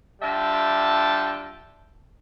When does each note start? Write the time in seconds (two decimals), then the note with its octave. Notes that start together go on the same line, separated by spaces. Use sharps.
0.22 D3 G3 F4 E5 G5 A5